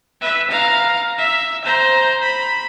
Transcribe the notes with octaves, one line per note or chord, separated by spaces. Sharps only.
B4 E5
F5 A#5
E5
C5 A#5
B5